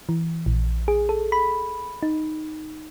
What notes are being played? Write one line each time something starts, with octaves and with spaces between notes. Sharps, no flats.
E3
A#1
G#4
A4
B5
D#4